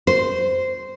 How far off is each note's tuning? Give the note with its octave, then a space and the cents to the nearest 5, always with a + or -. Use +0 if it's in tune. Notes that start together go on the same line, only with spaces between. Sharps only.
C5 -10